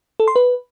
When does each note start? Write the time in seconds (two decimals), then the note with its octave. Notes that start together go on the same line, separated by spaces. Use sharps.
0.20 A4
0.28 C6
0.36 B4